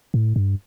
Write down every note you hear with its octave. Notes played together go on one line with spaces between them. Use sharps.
A2
G2